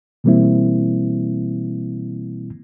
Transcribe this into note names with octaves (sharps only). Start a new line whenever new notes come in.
B2 E3 G3 A#3 C4 E4